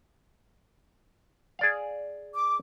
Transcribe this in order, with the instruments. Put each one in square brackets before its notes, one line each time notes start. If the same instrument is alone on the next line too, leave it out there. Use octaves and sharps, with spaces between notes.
[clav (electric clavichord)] G#4 D5 F5
[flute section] D6